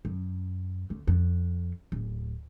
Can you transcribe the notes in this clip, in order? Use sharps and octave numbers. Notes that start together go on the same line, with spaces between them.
F#2
D2
F2
D1